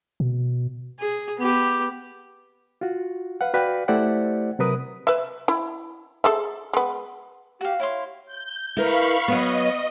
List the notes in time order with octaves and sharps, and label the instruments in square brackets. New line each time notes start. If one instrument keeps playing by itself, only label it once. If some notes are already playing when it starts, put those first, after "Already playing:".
[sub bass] B2
[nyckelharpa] G#4
B3 G4
[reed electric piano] F4 F#4
B4 F5 F#5
F#4 B4 D5 F5 G5
A3 E4 G4 C5 D5 F#5
C3 F#3 A#4 B4 D#6
[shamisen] B4 E5
E4
G#4 A4 E5
G#3 B3
[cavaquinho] F#4 F5 [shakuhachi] G4
[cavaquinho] E4 F5 C6 [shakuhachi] C#5
[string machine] G6
[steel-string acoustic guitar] E4 A#4 B4 [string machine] F5 B5 C#6
[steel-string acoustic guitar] F#3 B3 [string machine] D#5